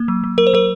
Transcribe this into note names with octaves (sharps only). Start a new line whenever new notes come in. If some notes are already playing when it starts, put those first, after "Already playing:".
Already playing: A#3
F#3
F#3
F#3 A#4
C5
F#3 A#4